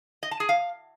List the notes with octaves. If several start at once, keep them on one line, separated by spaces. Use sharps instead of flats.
D#5
A5
G#4
F5